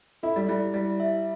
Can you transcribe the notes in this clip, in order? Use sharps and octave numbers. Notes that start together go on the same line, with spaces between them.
E4 A4
G3
G3 E4
G3 E4
E5